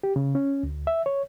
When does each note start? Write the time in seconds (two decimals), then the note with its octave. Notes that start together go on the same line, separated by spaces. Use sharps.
0.03 G4
0.16 C#3
0.35 C#4
0.63 D2
0.87 E5
1.06 C#5